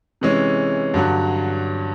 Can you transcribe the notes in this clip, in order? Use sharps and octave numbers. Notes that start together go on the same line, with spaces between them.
C3 E3 G#3 C#4
G2 D3 F#3